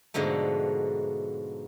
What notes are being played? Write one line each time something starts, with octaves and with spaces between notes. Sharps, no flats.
G#2 B2 D3 F3 A3